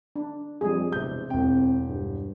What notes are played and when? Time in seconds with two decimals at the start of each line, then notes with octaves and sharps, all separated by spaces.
0.16 D4
0.61 F2 G3 G#4
0.92 E1 C3 G6
1.30 E1 C4 G5
1.89 G2